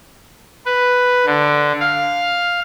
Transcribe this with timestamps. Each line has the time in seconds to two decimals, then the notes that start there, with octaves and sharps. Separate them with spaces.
0.66 B4
1.26 D3
1.80 F5